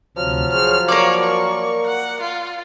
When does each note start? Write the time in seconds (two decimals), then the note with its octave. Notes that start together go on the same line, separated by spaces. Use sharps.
0.17 D2 C3 F3 F#3 F6
0.52 G#4 C5 C#5 F6
0.88 A#3 A#4 C#5 D5
1.23 C#6
1.86 F#5
2.21 F4